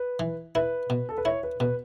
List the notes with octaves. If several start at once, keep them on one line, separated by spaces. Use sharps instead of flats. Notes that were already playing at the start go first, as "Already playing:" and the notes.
Already playing: B4
E3
E4 B4
B2
A4
B4
E4 C#5
B4
B2 B4